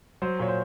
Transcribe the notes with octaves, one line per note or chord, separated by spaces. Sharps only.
F#3 C5
A#2 C#5
C5